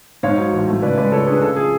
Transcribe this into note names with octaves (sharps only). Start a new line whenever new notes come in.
G#2 C#5 F5
F#3
A1
A3
C#3 B4 D5
G#3 B4 D5
C#2 A4 C#5
D4 G#4 B4
C#3 A4
F3 G#4